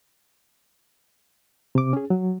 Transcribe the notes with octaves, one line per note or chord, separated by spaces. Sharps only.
C3 D6
C#4 G#4
F#3